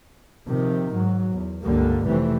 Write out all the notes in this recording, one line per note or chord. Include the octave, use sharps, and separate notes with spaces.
C3 D#3 F3
G#2 F#3
E2
C#2 G2 D3 G3 A#3
F1 C3 E3 G3 A3 C4